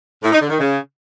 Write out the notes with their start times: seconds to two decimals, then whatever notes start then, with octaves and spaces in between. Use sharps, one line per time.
0.23 A2
0.32 D#4
0.41 D3
0.50 D#3
0.59 C#3